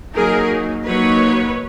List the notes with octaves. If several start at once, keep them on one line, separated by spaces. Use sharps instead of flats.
F#3 A#3 D#4 G#4 A#4
F#3 A#3 D#4 B4 C#5